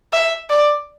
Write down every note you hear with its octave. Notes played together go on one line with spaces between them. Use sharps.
E5
D5